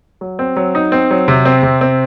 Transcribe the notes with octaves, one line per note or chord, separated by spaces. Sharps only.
F#3
C4
F#3
D#4
C4
F#3
C3
C4
C3
C4